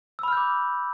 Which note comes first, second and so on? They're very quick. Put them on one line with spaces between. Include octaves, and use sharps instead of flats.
E6 B5 F6 G6 D6